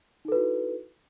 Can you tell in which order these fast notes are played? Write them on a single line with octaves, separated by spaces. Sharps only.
D#4 A4 B4 F#4 E4